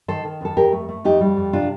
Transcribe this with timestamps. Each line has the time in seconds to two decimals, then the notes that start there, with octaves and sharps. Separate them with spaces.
0.08 D#3 A4 C5
0.25 D#3
0.41 F2 A4
0.57 F2 G4 A#4
0.72 A3
0.89 A3
1.04 F2 D#4 G4
1.21 G3
1.37 F2
1.53 C3 D4 F4